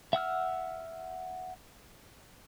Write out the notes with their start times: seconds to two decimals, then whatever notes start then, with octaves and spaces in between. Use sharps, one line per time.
0.13 E5 F#5 E6 F6